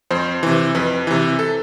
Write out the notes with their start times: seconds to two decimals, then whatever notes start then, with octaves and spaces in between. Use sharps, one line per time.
0.11 F2 C5
0.43 C3 E3
0.75 F2 B4
1.07 C3 E3
1.39 A4